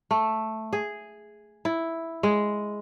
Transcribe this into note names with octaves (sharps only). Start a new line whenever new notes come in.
A3
G#4
E4
G#3